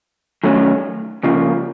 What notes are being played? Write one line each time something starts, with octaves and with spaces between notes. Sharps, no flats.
D#3 F#3 A3 C#4
C#2 C#3 F3 A#3